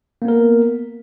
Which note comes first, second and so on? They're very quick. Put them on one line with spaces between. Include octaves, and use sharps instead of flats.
A#3 B3 A#4